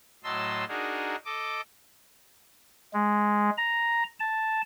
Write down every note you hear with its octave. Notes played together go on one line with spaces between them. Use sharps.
A2 F#3 D#5 A5 C6 E6
D4 D#4 F#4 G#4 A#4
A4 D#5 D6
G#3
A#5
A5